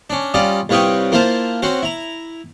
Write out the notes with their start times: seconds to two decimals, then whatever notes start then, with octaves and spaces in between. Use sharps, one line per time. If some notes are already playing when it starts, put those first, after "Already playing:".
0.10 C#4 D4
0.34 G3 C#4 F4 D5 D#5
0.69 C2 F4 B4 C#5 D#5 G5
1.12 A#3 E4 F4 C5 F5 A5
1.62 C4 C#4 F#4 C5
1.82 E4 A#5